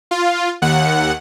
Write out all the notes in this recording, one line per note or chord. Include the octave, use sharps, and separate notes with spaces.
F4
D#2 F#5